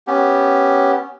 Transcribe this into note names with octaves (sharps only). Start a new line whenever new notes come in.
B3 C#4 G4